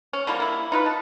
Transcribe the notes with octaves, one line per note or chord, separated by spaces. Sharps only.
C#4
D3 F3 G3 A#3
A#3 E4
D#4 F4 B4
A5